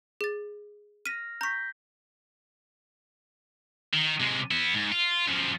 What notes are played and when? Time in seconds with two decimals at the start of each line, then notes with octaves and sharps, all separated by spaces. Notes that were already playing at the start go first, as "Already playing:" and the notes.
0.21 G#4 A6
1.06 F6 A#6 B6 D#7
1.41 A#5 C#6 G6 A#6 B6
3.93 D#3
4.20 C3 G#3
4.51 B3 E4
4.74 G#2
4.92 F4
5.27 F#2 F3